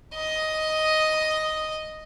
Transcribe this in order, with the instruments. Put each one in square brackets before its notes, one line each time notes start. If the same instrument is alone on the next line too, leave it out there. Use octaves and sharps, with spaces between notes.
[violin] D#5